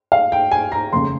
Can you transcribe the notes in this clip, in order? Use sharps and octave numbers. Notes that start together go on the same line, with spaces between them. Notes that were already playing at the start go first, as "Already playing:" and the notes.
F5
G5
G#5
A#5
F1 D#2 C#3 G#3 C6